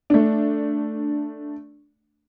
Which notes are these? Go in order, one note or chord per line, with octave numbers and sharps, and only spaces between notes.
A3 D4